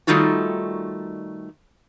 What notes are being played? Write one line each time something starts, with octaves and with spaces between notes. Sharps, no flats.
D#3 G3 A3 D#4 F4 F#4